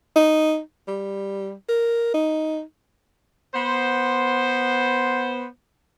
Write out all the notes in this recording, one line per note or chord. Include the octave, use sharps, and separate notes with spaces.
D#4
G3
A#4
D#4
B3 C5